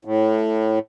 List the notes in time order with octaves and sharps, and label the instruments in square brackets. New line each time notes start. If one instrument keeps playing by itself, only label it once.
[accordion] A2